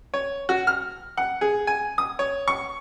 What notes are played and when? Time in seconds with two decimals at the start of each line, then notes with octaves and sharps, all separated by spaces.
0.14 C#5
0.49 F#4
0.67 F6
1.17 F#5
1.41 G#4
1.67 G#5
1.98 D#6
2.19 C#5
2.48 C#6